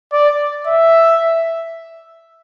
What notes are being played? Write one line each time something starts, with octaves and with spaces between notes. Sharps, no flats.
D5
E5